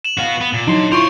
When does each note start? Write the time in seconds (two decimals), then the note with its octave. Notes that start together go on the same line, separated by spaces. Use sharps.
0.05 E7 F#7
0.18 B3 F#4 F5
0.41 B3
0.54 A#2
0.67 F#3 D4 D#4 C6
0.92 E4 F4 C5 C#5 C6 C#6 D7 F7